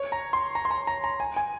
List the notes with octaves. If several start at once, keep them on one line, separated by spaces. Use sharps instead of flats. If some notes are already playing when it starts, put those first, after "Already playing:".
Already playing: C#5
A#5
C6
A#5
C6
A#5
A#5
A#5
G#5
G#5